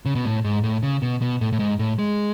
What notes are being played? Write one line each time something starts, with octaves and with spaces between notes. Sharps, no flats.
C#3
B2
A2
G#2
A2
C#3
B2
B2
A2
A2
G#2
A2
G#3